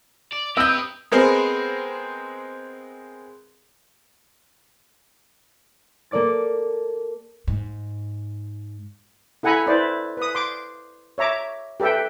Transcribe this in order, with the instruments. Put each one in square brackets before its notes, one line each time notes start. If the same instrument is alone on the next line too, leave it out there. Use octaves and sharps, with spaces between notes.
[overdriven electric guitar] D5
[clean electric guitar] C4 A#4 D#5 [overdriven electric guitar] G4 B4 [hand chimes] D#6 [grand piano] E6 G6
[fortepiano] G#3 B3 C4 G#4 A#4 C5
[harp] A#3 A4 D5 D6 A6
[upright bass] G#2
[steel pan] E4 A4 F#5 G#5 A#5 B5
E4 B4 C5 D5
B4 D#6
C6 D6
C#5 E5 A#5 D6
G4 A4 B4 E5 G5